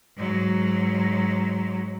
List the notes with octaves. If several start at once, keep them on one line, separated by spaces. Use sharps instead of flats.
G#2 F#3